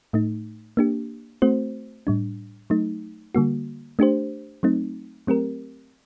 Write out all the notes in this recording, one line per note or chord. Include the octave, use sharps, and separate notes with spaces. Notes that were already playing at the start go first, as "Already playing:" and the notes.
A2 A3 D#4
A#3 D4 G4
A3 C4 F#4 C5
A2 G3 D4
F#3 A3 D#4
D3 G3 A#3 F#4
A3 D4 G4 C5
F#3 A3 C4 D#4
F#3 A3 C4 G4 A#4